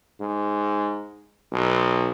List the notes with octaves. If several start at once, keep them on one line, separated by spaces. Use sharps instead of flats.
G#2
B1